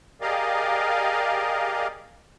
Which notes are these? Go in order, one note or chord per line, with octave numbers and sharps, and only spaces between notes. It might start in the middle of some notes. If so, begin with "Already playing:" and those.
G4 G#4 A#4 D5 D#5 F5